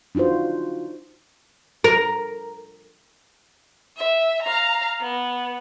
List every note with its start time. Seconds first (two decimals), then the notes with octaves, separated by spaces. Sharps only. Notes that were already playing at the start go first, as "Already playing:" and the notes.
0.15 D4 D#4 F4 F#4 C5
1.84 A#4
3.97 E5
4.43 F5 A#5
5.01 B3